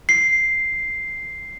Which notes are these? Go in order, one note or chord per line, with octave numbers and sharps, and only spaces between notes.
C7